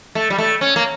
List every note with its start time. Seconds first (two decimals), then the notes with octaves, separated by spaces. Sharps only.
0.15 A3
0.30 G3
0.38 A3
0.61 C#4
0.76 A#3